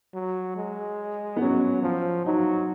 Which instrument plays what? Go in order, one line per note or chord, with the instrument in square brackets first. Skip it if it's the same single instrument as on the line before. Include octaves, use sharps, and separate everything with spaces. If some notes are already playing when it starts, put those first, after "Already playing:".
[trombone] F#3
G#3
[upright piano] B3
[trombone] F#3 [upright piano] C#4
[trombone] F3
[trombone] F#3 [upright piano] D#4